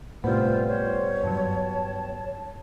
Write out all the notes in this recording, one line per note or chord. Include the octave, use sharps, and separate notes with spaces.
A2 C3 G3 B3 F4 C5
C5 C#5
G2 F#3 A5